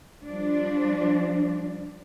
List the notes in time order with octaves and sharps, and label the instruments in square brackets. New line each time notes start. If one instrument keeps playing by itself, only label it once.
[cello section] F3 G3 D4